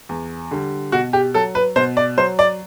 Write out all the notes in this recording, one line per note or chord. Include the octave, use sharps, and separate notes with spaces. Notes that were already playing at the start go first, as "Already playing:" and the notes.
E2
D3 G3
B2 F#4
G4
F#3 A4
B4
B2 C5
D5
F#3 C5
D5